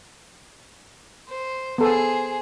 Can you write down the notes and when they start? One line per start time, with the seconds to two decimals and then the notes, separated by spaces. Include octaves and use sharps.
1.29 C5
1.78 B3 G#4 A4 C5